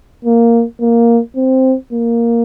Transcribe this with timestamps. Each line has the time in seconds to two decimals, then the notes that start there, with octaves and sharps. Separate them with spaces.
0.25 A#3
0.81 A#3
1.36 C4
1.93 A#3